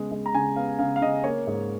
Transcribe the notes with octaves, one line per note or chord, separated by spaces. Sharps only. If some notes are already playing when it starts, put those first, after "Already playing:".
Already playing: C#3 G#3 B3
G#3
A#5
C#3 G#5
B3 F5
C#3 F5
F5
C#3 D#5
A#3 C#5
G#2